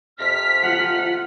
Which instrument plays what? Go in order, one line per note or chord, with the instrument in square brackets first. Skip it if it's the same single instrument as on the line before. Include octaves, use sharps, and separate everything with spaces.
[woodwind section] F2 C3 F6 [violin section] B6
[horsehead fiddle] F4 F#5